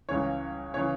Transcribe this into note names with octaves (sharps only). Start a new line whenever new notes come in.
C#2 C#3 E3 C#5
C#3 E3 C#5